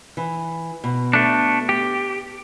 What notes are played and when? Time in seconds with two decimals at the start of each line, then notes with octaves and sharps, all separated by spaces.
0.17 E3
0.84 B2
1.13 A3 D4
1.69 G4